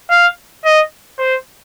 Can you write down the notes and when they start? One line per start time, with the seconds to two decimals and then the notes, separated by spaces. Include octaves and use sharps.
0.10 F5
0.65 D#5
1.19 C5